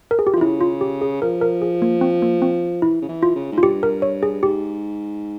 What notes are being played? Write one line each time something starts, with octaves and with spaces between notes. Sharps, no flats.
A#4
G#4
G4
F4
E3
C#3 E4
F4
G4
G#4
F3 A#4
A#4
G#4
A#3
C4
A#3
C4
E3 E4
C#3
E3
F4
C#3
G#2
F4
G2 G4
A#4
C#5
G#4
G#2 G4